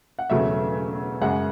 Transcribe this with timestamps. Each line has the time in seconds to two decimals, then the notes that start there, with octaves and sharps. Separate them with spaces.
0.19 F#5
0.30 E1 E2 C#3 F#3 A3 E5
1.21 F#2 C#3 G#3 F#5